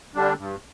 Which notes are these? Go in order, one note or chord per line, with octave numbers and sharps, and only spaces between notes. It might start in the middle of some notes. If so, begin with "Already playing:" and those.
D3 G3 D4
G2